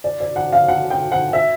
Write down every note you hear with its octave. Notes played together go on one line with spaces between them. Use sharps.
D5
D5
F#5
F5
F#5
G5
F#5
E5